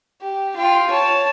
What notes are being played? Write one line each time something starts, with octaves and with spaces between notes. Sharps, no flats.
G4
F4 G5
C#5 A5